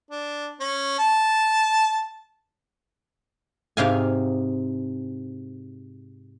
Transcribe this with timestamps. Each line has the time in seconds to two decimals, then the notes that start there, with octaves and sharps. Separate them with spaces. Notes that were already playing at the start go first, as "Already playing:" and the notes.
0.10 D4
0.60 C#4
0.99 A5
3.77 G#2 C3 F5 G#5